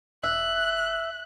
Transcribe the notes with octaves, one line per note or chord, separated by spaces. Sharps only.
E1 E5 F#6